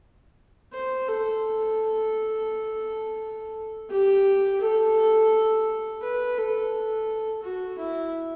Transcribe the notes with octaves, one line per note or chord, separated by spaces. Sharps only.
C5
A4
G4
A4
B4
A4
F#4
E4